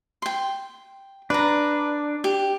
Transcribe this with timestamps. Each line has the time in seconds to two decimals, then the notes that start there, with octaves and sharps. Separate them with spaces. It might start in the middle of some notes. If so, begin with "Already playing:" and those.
0.22 G5 C6
1.30 D4 B4 A#5
2.24 G4